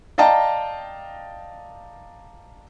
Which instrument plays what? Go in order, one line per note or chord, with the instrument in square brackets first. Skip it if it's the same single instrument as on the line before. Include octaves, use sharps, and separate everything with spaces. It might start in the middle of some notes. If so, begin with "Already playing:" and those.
[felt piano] D5 D#5 F5 G5 A5 A#5